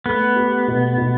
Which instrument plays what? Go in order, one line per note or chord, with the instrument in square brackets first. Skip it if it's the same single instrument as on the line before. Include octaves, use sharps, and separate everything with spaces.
[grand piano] A3 [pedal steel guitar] B3
[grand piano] G4
B2
B2